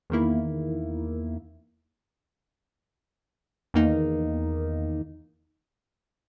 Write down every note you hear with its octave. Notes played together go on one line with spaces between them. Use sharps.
E2 D#3 A#3 E4
E2 D#3 A#3 D#4